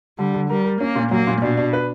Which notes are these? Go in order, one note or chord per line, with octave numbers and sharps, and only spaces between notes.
D3 G3
D3
G3 A#4
A#4
A#3 C#4
A#2
F#3 A#3
A#2
B2 D4
D4
B4